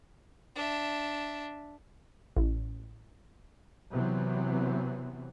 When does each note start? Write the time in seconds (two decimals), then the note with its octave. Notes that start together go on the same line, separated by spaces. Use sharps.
0.55 D4 E5
2.36 A1
3.92 C3 E3 F#3 B3 C4